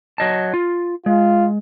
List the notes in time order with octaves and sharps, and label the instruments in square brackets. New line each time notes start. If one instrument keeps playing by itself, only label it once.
[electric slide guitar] F#3 D#5 A5
F4
[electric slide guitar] G#3 [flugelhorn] F4